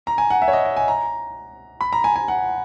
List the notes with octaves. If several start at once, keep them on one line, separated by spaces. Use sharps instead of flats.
A#5
G#5
F#5
E5
C#5
D#5
D#5
G#5
A#5
B5
A#5
G#5
G#5
F#5